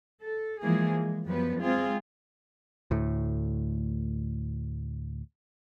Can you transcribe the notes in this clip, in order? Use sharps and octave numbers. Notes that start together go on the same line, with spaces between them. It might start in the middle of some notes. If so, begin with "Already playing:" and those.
A4
E3 F3 G#3 A#3 G#4
G#3
F#2 F3 G3 B3 B4
G#3 C4 F4 G#4
D2 A2